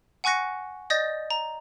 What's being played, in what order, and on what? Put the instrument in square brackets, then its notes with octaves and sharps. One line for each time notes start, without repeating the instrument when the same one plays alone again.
[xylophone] F#5 G#5 C#6 F#6 A#6 C#7
D5 D#5 D#6 G6 A6 A#6
A#5